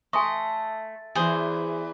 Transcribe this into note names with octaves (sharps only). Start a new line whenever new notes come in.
A3 D#5 G#5 C6 C#6
E2 E3 G#4 C5